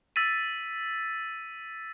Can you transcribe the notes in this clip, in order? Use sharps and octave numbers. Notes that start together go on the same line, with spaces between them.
E6 A6 B6 D#7